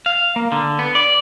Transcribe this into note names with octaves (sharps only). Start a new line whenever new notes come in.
F5
A#3
D3
B3
D5